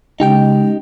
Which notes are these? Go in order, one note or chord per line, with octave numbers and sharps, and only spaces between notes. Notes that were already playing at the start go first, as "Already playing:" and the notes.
C#3 G#3 D#4 G4 G5